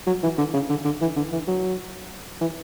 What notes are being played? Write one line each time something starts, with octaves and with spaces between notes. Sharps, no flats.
F#3
E3
D3
C#3
D3
D3
E3
D3
E3
F#3
E3